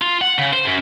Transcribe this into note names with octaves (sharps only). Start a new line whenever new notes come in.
F4
F#5
C#3
C5
F#2